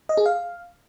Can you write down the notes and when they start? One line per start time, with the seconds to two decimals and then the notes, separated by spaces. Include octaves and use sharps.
0.09 D#5
0.17 G#4
0.26 F5